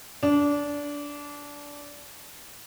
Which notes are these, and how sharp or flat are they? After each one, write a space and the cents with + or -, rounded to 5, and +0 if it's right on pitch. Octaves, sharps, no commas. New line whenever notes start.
D4 -20